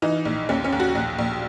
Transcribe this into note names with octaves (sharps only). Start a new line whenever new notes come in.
E3 D#4
A#1
D#2 C#4
C#4
D#2
F#4
A#1
A#1